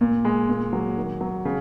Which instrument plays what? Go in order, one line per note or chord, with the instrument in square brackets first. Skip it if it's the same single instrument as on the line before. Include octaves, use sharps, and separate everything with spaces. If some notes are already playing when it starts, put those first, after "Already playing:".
[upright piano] A#2
G#3
A#2
F#3
D#3
F#3
C#3